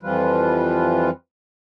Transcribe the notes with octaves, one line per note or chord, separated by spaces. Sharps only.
F2 E3 F3 G3 F4 B4